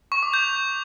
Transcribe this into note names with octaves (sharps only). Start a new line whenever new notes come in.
C#6
D6
G6